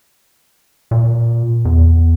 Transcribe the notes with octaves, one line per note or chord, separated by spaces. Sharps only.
A#2
E2